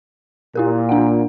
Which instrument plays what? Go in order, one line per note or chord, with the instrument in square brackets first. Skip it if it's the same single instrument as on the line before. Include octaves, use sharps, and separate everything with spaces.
[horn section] A#2 [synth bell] E4 G4 A#4
[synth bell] D4 F#5